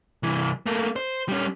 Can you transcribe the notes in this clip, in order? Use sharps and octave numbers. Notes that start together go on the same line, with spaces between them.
C2 E3
A3 A#3
C5
G3 C#4